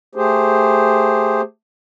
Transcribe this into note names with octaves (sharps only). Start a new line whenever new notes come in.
A3 G4 G#4 C5